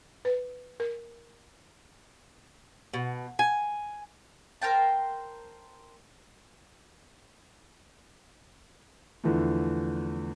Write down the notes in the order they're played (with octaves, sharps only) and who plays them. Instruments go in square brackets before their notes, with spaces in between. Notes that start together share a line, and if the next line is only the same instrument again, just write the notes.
[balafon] B4
A#4
[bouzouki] B2
G#5
[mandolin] A#4 C5 G5 A5
[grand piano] E2 D3 E3 F3 A3